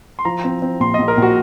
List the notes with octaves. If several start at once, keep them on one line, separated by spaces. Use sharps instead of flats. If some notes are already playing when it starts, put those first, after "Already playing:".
C6
F3 A#5
C4
C4
A#1 C6
D#5
A#1
A#4
A#1 F#4